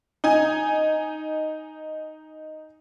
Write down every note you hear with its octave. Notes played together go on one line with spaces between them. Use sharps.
D#4 G#5